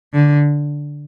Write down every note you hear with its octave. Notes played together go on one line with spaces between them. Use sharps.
D3